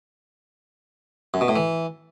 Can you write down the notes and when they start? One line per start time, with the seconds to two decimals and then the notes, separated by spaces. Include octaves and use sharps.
1.34 F#2
1.41 B2
1.48 A2
1.56 E3